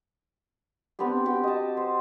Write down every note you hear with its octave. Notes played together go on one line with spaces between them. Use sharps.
B3 C4 D4 G4
C4 F#4 G4 G5
D#5 A5
C5